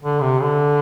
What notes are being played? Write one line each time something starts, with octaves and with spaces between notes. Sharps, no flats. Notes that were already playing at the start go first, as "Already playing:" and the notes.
D3
C3
D3